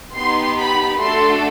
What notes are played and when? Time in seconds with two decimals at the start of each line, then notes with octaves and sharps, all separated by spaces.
0.16 B3 D#4 G4 C6
0.58 B5
0.99 A3 D4 F#4 A4 C6